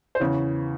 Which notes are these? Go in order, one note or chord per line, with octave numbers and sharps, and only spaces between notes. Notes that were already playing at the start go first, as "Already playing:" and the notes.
C5
E2 C#3 E3 C#5